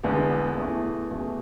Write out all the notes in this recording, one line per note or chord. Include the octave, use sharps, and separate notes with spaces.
E1 E2 D3 B3
E2 E3 A3
E2 B2 A3